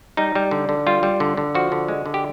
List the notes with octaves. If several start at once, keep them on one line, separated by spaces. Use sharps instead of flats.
G3 D#4
G3
D3
D3
G3 F4
G3
D3
D3
F3 F#4
D3
G#3
D3
G4